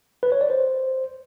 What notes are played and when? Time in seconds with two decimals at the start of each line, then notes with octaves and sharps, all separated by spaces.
0.23 B4
0.32 C#5
0.41 D5
0.50 C5